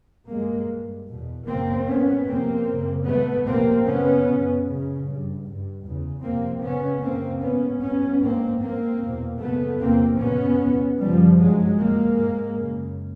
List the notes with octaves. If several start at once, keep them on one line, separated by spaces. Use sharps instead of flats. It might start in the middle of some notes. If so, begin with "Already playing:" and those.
G2 G#3 A#3
G2
E2 B2
F#2 C#3 A#3 C4
G2 B3 C#4
F2 C3 A#3 C4
F#2 C#3
G#2 A3 B3
F2 C3 A#3 C4
F#2 C#3 B3 C#4
F#2 C#3
F#2 C#3
G2
G2
E2 C#3
F2 C3 A#3 C4
F2 C#3 B3 C#4
F#2 C#3 A#3 C4
G#2 B3 C#4
G2 B3 C#4
G#2 A#3 C4
G#2 A#3 C4
E2 B2
F#2 C#3 A3 B3
E2 C3 A#3 C4
F#2 C#3 B3 C#4
E2 C3
F#2 C#3 F3 G3
G2 F#3 G#3
F2 C3 G#3 A#3
G#2
F#2 C#3